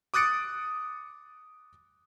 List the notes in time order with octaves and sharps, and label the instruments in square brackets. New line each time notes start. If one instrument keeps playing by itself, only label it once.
[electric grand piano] D6 D#6 F#6 A6 C#7 D7